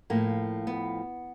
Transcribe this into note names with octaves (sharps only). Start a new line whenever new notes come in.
A2 F3 A#3
B3